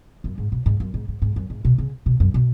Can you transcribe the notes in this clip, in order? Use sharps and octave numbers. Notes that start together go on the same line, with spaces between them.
F#2
G#2
B2
G#2
F#2
G#2
G#2
G#2
F#2
G#2
B2
C#3
B2
F#2
B2